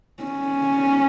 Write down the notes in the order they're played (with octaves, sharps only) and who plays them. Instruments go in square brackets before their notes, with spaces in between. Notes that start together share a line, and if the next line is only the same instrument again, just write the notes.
[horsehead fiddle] C#4